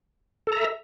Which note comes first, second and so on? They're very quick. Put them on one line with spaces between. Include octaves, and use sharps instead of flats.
A4 A#5 E5